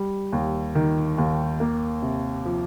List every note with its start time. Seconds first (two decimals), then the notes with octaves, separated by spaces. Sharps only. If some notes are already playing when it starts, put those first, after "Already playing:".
Already playing: G3
0.32 D#2
0.75 D#3
1.18 D#2
1.60 A#3
2.02 C3
2.45 F3